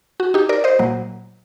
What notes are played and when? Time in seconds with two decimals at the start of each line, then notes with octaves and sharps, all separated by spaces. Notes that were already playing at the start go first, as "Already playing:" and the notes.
0.20 F#4
0.34 D#4 G4
0.49 A#4 D5
0.64 C5 D#5
0.79 A#2 F#3 A#3